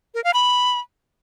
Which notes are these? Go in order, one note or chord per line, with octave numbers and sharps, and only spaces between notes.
A#4
F5
B5